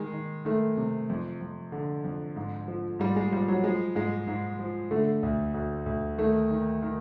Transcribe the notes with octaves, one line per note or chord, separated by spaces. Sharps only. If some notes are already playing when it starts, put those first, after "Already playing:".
Already playing: D#3 G#3
D#3
D#3 A3
C3
F2
F2
D3
F2
G#2
F3
G#2 G3
G#3
F3 G3
F#3
F3 G#3
G#2 G#3
G#2
F3
D3 A3
D2
D2
D2
D#3 A3
D#3
D#3